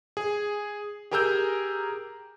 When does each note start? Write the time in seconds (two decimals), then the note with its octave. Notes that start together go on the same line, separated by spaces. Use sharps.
0.17 G#4
1.11 G4 G#4 A#4 A#5 E6 G6